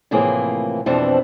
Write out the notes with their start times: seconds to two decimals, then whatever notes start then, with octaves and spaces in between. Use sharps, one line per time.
0.11 A2 C3 E3 F3 A#3 G#4
0.86 F2 B2 E3 F3 C4 D4